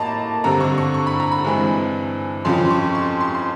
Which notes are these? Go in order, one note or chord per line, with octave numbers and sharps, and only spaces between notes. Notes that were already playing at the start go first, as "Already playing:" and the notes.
Already playing: A2 A#3 D#5 A5 A#5
G2 D3 G3 C4 A#5
C#6
C#6
C#6
B5
A#5
B5
G2 E3 G#3 C4
F2 C#3 F3 C6
C#6
C6
C6
C6